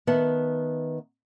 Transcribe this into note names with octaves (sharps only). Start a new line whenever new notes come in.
D#3 B3 E5 F#5 A5